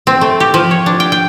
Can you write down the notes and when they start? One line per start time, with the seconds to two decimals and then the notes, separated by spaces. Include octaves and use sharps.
0.07 C4
0.21 A3
0.40 G4
0.54 F3
0.71 C#5
0.86 D4
1.00 G5
1.12 G5